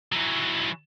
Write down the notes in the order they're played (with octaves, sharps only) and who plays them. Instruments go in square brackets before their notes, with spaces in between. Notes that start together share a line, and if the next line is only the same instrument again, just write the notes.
[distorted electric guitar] E3 F#3